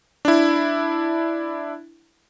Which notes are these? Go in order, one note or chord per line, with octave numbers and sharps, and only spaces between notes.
D4 E4